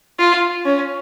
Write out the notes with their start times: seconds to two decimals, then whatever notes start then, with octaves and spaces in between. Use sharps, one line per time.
0.19 F4
0.65 C#4